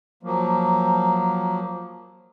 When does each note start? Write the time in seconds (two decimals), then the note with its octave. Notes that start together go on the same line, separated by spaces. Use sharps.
0.23 F3 F#3 A#3